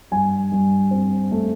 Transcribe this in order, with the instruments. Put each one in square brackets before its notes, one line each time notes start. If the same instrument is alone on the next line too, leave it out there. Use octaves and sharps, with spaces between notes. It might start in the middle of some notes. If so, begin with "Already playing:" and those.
[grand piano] G2 G#5
G2
C4
A3